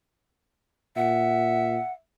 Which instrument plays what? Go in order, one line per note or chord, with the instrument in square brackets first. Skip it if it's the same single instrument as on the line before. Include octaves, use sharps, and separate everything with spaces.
[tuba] A#2 [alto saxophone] E5 [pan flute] F#5